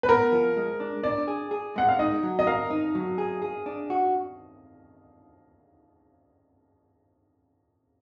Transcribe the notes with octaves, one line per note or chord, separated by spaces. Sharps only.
B4
B3 A#4
F3
G#3
D4
D4 D5
G#4
G#4
G#3 F#5
F5
D#4 D#5
F#3
D#5
A#4 F5
D#4
F#3
G#4
G#4
D4
F#4